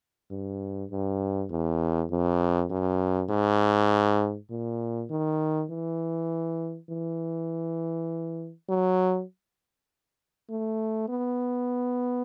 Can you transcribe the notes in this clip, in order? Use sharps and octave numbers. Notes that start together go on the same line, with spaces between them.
G2
G2
E2
F2
F#2
G#2
A#2
D#3
E3
E3
F#3
A3
B3